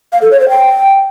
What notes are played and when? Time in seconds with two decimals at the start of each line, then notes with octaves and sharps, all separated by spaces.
0.13 F5
0.22 A4
0.31 C#5
0.40 C5
0.49 G5